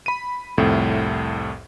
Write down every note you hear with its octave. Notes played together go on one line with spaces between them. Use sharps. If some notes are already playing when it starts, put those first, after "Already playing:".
B5 D#7
C2 F2 A2